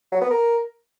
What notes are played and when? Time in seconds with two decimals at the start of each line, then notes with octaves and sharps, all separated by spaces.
0.12 F#3
0.21 B3
0.31 A#4